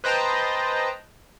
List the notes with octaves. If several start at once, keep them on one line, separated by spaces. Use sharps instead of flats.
B4 C5 D#5 G5 A5 A#5